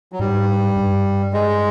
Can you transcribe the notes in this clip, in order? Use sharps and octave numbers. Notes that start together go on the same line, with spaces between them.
F#3
G#2 G3
G2
G#3